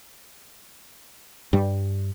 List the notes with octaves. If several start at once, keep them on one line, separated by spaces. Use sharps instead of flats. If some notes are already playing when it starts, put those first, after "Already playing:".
G2 G3